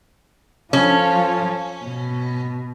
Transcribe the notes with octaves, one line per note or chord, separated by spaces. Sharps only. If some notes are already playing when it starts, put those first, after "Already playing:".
F3 C#4 F4 A4
B2